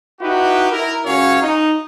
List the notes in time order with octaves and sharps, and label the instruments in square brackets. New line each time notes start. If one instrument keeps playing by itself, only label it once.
[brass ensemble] D#4 E4 F#4 G4 B4
E4 A#4
C#2 C#4 F#4 C#5 F5
D#4